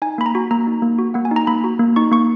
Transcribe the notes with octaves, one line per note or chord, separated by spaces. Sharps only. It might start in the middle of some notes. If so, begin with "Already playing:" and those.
D#4 G#5
A#3 B5
A#5
F#4
A#3 A#5
D#4
A#3
F#4
A#3 F#5
G#5
D#4
A#5
A#3 B5
F#4
A#3
D#4 C#6
A#3 C#6